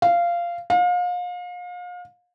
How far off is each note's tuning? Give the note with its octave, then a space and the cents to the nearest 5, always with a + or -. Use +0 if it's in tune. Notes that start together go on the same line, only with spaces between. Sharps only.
F5 -15
F5 +35